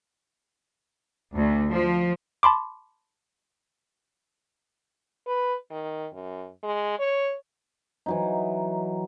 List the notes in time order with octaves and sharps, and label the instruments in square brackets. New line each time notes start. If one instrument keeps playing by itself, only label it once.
[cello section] D2
F3
[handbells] A5 B5 C6 D6
[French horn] B4
D#3
F#2
G#3
C#5
[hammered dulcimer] E3 F#3 D#4